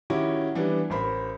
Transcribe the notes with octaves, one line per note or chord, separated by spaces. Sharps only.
D#3 C#4 E4 F#4 G4
E3 G3 B3 D4
A1 A#4 C5 B5